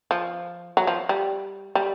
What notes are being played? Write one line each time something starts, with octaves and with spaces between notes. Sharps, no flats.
F3
F#3
F3
G3
G3